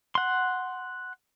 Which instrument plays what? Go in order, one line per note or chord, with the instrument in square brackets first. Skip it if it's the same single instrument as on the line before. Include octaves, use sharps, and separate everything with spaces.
[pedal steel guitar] F#5 C6